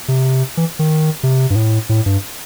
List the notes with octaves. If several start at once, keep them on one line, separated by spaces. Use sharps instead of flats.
C3
E3
D#3
C3
G2
A2
A2
G2